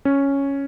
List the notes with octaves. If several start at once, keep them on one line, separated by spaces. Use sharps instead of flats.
C#4